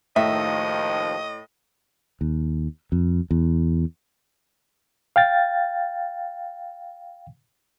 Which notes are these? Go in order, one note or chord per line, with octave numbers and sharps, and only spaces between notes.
D#2 A2 D#3 F3 D#5 E5
D#2
F2
E2
F5 G5 A6